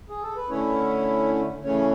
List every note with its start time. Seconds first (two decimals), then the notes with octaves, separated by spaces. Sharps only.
0.09 G#4
0.23 A4
0.36 B4
0.50 D3 A3 C#4 E4 C#5
1.64 C#3 E3 A3 C#4 C#5